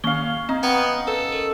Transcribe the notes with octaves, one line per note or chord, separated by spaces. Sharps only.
D#3 A#3 C#4 F5 G7
C4 D#4
B3 G5 A#5 G#6
A4 B4
A#4